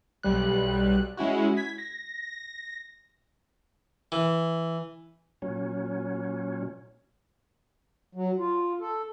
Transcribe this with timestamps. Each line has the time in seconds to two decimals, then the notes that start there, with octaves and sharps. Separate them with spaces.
0.23 B1 G3 F#6
1.17 G#3 C#4 E4 F#4
1.57 G#6 B6
1.78 A#6
4.12 E3
5.42 A#2 F#3 C#4
8.15 F#3
8.39 F4
8.80 A4